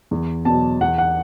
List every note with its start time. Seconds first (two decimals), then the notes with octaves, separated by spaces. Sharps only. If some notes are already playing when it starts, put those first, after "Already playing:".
0.11 E2
0.45 B2 F#3 A5
0.80 E2 F#5
0.98 F#5